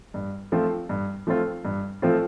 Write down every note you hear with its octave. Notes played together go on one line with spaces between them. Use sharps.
G2
F3 A3 C4 F4
G2
F3 A3 C4 F4
G2
F3 A3 C4 F4